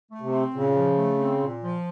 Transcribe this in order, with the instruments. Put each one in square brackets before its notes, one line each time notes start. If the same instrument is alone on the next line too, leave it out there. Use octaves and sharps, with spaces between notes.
[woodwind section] A3
[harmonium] C3
[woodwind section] C4
[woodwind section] A#2 [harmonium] C#3
[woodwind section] F3
A3
C4
A#2
F3